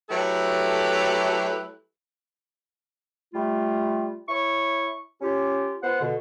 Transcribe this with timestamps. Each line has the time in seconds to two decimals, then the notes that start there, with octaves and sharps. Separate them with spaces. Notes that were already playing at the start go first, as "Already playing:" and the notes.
0.10 F#3 A3 E4 G4 A4 B4
3.34 G3 A3 F4
4.29 E4 C#5 C#6
5.21 C#4 F4 G4
5.83 B3 F4 C5 F#5
6.01 B2 D3